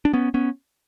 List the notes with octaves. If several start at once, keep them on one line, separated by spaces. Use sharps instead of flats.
D4
B3 C#4
B3 C#4